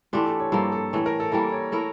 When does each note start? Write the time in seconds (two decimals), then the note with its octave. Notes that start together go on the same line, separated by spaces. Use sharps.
0.13 E3 A3 D4 F4 G4
0.26 A4
0.40 C#5
0.52 G2 F3 A#3 A4
0.72 A4
0.93 A2 E3 A3 C#5
1.06 A#4
1.20 A4
1.32 E3 G3 A#3 A4
1.52 C#5
1.72 A3 E4 A#4